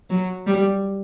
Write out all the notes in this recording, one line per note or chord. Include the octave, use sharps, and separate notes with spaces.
F#3
G3